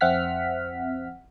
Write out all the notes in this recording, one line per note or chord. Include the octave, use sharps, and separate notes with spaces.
F2 C4 E5 F#5 F6 B6